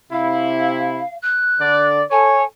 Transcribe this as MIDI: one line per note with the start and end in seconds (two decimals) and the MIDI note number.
0.12 1.02 48
0.12 1.02 64
0.12 1.15 77
1.22 1.84 90
1.60 2.03 50
1.60 2.03 74
2.11 2.42 69
2.11 2.42 73
2.11 2.43 80